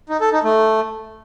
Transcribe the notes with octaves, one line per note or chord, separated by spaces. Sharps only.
D#4
A4
D#4
A3